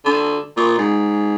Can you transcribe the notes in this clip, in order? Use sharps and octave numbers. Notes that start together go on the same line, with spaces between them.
D3
A#2
G#2